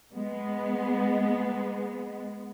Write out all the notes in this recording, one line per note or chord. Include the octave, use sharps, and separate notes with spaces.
G#3 B3